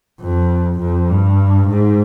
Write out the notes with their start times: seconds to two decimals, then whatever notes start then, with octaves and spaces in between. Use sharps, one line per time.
0.21 F2
0.79 F2
1.09 G2
1.69 G#2